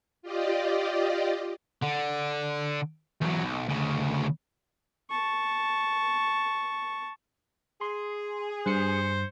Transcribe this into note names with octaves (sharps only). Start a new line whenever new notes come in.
F4 G4 D5 D#5
D3
E2 F#3
B1
D2 C#3
A5 C#6
G#4 C6
G2 C5 C#7